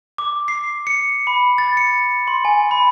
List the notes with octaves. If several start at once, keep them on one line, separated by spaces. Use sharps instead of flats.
D6
C7
C#7
B5
A6
C#7
C6
G#5
B5